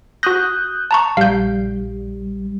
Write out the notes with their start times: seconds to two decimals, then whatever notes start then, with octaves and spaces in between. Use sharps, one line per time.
0.23 F#4 D#6 F#6 G6 A#6
0.91 A5 A#5 C#6
1.17 A#1 G3 F5 G6